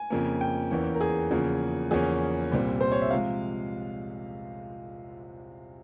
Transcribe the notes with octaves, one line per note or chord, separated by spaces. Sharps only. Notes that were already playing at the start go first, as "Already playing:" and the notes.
Already playing: G#5
F2 C#3 F3 A#3
G5
E2 E3 A#3 C#4
A#4
G#4
E2 C#3 F3 A#3
E2 C#3 F3 A#3 C#4 G#4
C2 A#2 G3 C4
C5
C#5
E5
C3 F3 G#3 F5